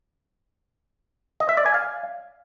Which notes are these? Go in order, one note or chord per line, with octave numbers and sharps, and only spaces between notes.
D#5
E5
D5
G#5
F5